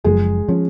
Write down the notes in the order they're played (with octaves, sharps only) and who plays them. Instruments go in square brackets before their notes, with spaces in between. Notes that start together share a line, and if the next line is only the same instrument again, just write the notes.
[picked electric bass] F#1 F#2 F3 [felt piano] G#3 G#4
[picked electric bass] F3 [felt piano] C#4